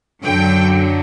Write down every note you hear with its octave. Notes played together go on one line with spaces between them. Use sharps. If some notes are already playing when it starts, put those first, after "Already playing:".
F#2 D3 F#3 G5